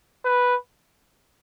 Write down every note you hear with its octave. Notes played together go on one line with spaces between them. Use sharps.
B4